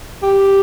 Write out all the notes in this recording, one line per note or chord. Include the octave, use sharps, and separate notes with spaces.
G4